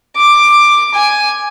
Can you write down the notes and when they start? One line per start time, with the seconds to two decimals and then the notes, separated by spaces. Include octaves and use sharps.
0.16 D6
0.94 G#5